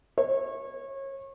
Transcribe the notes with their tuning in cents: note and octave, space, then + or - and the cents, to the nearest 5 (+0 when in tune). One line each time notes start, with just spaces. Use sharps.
C#5 -30